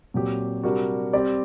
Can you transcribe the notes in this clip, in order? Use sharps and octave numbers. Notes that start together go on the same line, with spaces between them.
A#2 F#3 C4 G4
C3 G3 D4 F#4 A#4
G3 C4 G4 D5